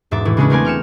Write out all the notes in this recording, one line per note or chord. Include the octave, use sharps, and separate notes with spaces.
E1 G#2 E5 D6 A6
A2 E3 E4
C#3 G#3 B3 C#4 D4 E4
A3 B3 C4 A#4 D5 G#5
G5 F6 C#7 E7